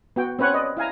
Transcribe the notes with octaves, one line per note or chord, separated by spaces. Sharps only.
B3 F#4 G5
C4 C#4 B4 C#5 F#5
B4 D5 D#5
E4 F5 G#5 A#5